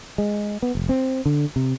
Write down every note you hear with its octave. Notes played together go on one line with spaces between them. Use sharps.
G#3
B3
F1
C4
D3
C3